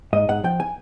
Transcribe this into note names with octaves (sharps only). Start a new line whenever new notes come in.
G#2 D#5
G#2 F#5
F3 G5
G#5